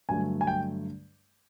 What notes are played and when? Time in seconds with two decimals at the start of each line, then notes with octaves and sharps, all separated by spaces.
0.09 G2 D3 F#3 A3 G#5
0.41 G#5
0.47 G5